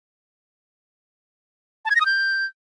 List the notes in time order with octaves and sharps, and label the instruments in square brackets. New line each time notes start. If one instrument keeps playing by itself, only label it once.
[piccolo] A5
G#6
A#6
D#6
G6